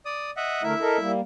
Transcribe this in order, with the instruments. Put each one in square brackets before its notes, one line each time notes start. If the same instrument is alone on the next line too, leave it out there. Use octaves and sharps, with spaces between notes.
[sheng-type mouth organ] D5 D#6
D#5 E5 F#5
[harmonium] D3 A3 A#4 [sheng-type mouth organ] E4 E5
[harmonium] A4 A#4 D#5
G3 A#3